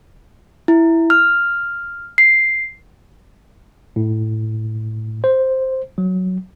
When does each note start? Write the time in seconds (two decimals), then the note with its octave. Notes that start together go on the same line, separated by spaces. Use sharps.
0.68 E4
1.10 F6
2.18 C7
3.96 A2
5.24 C5
5.98 F#3